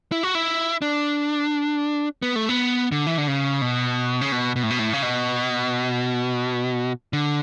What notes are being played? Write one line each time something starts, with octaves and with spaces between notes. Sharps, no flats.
E4
F#4
E4
D4
B3
A3
B3
D3
E3
D3
C#3
B2
C#3
B2
B2
A2
B2
A2
C#3
B2
D3